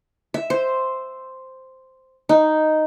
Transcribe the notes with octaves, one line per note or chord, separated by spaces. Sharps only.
E5
C5
D#4